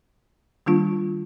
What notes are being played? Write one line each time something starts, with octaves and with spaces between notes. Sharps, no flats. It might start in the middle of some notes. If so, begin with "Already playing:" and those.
D#3 G3 A#3 D4 F4